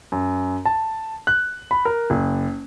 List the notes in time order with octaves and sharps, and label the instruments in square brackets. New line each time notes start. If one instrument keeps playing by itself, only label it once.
[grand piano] F#2
A5
F#6
B5
A#4
F#1